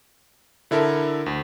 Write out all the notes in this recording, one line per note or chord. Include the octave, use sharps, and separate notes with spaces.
D3 E4 A4 A#4
D2